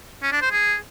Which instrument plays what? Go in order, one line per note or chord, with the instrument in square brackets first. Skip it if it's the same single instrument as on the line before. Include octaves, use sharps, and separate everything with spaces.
[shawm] C#4
D4
C5
G#4